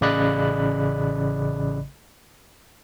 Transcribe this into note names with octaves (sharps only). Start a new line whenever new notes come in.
A1 C#3 D5 D#5 B5 F#6